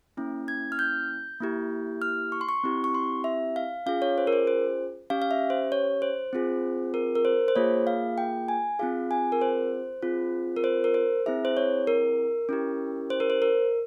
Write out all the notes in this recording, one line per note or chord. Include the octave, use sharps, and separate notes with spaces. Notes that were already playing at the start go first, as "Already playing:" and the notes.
A#3 C#4 E4
G#6
F6
G6
A#3 E4 G4
F6
C#6
C6
C#6
C4 E4 G4
C#6
C6
E5
F5
C#4 F4 G#4 F5
C#5
C5
A#4
C5
C5
C#4 G4 F5
F5
E5
C5
C#5
C5
C4 F4 G#4
A#4
A#4
C5
C5
A#3 F4 G#4 C#5
F5
G5
G#5
C4 F4 G#4 F5
G#5
A#4
C5
C4 F4 G#4
A#4
C5
A#4
C5
C4 E4 G#4 E5
C5
C#5
A#4
C#4 E4 G4
C5
A#4
C5
A#4